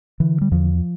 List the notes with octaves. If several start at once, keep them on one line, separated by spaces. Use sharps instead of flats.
D3 E3
G3
E2 F3